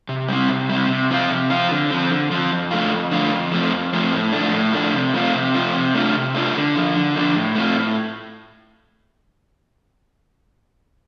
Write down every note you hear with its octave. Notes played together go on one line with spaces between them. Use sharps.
C3
G3 C4
C3
G3 C4
C3
F3 C4 F4
C3
F3 C4 F4
D3
F3 C4
D3
F3 C4
F2
D3 A3 F4
F2
D3 A3 F4
F2
F3 A3 C4
F2
F3 A3 C4
A2
F3 A3 D4
A2
F3 A3 D4
C3
F3 A3 C4 F4
C3
F3 A3 C4 F4
C3
A3 D4 F4
C3
A3 D4 F4
D3
F3 D4
D3
F3 D4
A2
A3 C4 F4
A2